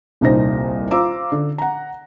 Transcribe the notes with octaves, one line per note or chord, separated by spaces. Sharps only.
D#1 C2 A#2 D#4 C5 A#6
F4 C5 A#5 D6 E6
D3
F#5 A#5